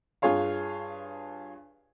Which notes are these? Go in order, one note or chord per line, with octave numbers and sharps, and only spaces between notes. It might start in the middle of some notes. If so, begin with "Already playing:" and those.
G2 F4 G#4 C#5 F5